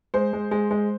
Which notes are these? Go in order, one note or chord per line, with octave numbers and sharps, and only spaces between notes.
G#3 C5
G#3
G#3
G#3